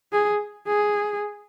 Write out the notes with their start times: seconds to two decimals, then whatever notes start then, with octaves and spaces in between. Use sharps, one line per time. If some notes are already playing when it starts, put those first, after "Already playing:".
0.12 G#4
0.67 G#4